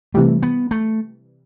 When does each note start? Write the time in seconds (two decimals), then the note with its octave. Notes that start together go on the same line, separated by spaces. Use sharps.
0.14 C3 E3 G3 A3
0.43 B3
0.71 A3